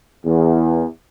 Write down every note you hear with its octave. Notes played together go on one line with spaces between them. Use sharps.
E2